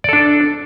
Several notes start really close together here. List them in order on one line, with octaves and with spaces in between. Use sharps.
D5 A4 D4